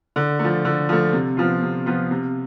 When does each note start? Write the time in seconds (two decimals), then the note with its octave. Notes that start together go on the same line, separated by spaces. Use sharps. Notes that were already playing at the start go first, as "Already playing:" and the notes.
0.16 D3
0.39 F3 A3
0.65 D3
0.89 F3 A3
1.13 C3
1.37 F3 B3 F4
1.62 C3
1.86 F3 B3 F4
2.11 C3